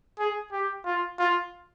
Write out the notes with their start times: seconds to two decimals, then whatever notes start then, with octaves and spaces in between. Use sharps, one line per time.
0.19 G#4
0.52 G4
0.85 F4
1.18 F4